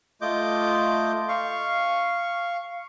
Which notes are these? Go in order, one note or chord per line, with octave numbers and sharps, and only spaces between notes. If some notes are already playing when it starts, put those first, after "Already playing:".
A3 F4 D#5 D6 G6
F5 C#6